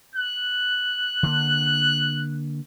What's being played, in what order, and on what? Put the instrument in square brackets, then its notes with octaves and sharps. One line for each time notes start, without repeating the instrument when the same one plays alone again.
[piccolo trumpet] F#6
[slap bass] D3 A#3